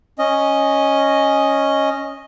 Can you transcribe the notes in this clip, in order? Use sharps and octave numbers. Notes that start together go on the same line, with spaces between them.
C#4 D#5